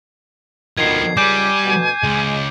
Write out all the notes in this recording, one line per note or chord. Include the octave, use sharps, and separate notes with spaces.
B2 D3 D#3 F3 B3 G#6 C7
C#2 G3 G#5 D6 G6
D2 B2
C#2 G#3